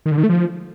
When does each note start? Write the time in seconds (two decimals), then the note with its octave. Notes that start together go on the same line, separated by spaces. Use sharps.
0.06 D#3
0.12 D3
0.18 D#3
0.23 A3
0.29 F3